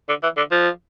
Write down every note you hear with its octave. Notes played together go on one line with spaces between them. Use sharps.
D3
E3
D3
F3